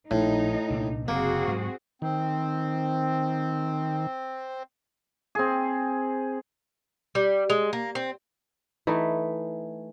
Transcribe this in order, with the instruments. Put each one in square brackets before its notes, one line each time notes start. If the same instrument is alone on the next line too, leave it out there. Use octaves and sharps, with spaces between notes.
[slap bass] A#1 [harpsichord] A2 [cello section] D#4
[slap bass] C2 A#2 D4
[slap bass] F#1 C3 [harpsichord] A#3 [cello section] C4 F#4 G#4
[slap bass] G#2 F#3
[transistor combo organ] D#3 [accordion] C4
[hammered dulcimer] C4 G#4
[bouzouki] G3
G#3
A#3
C4
[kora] E3 A3 D#4